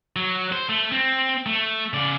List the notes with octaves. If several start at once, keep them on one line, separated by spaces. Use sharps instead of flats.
F#3
C5
A3
C4
A3
C#3 D5